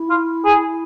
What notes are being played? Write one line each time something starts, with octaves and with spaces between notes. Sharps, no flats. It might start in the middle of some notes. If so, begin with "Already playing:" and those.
Already playing: E4
F4
G#4